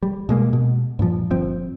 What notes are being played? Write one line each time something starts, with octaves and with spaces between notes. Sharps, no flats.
G3
B2 G#3 A#3
B2
G2 A#2 F3
G1 F3 C4